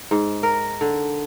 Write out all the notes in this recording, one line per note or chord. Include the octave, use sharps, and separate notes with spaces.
G#2
A#4
D3